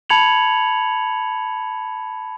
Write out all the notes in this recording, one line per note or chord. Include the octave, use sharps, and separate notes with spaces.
A5 B5 G#6 C#7 F7 F#7